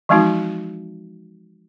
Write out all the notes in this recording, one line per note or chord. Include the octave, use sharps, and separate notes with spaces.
E3 F3 G#3 C4 D#4 F#4